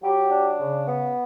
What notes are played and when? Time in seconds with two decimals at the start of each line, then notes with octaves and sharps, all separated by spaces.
0.02 F#3 G4
0.30 D4
0.59 C#3
0.88 B3